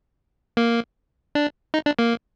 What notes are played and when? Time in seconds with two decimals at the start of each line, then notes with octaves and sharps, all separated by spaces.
0.57 A#3
1.35 D4
1.74 D#4
1.86 D4
1.99 A#3